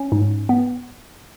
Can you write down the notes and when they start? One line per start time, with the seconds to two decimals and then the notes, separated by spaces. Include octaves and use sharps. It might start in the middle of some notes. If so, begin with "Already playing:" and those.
Already playing: C#4
0.12 G#2
0.49 B3